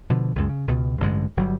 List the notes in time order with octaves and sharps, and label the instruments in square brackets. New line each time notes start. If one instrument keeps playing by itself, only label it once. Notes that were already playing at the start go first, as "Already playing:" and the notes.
[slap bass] B2 D3 F3
C#2 F#2 G#3
C#3
C#2 B2
A1 G2 D3 G#3
G1 F#3 G3